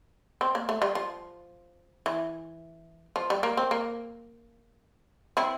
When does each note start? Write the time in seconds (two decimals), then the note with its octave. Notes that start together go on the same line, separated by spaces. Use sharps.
0.41 C4
0.55 A#3
0.69 A3
0.82 G3
0.95 F3
2.06 E3
3.16 F3
3.30 G3
3.43 A#3
3.57 C4
3.71 A#3
5.37 C4 E4